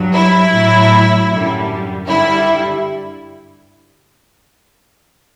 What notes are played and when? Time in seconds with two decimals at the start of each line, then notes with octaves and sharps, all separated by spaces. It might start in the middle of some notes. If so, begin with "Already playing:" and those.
Already playing: G2 F#3
0.13 E4
0.52 A2 F#3
1.30 F#2 D3 G3
2.08 G2 D3 G3 E4